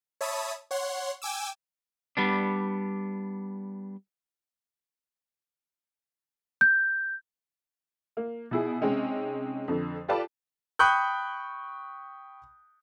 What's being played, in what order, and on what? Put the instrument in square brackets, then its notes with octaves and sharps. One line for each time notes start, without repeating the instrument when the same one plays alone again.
[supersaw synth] C#5 E5 A5 B5 D#6
C#5 F#5 C6
G5 G#5 D6 E6
[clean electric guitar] G3 B3 D4
[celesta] G6
[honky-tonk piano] A#3
B2 E4 G#4
C3 G#3 C4 C#4 D#4
F2 D3
F4 G4 A4 B4 D5 A5
[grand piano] G5 B5 C#6 D#6 F#6 G6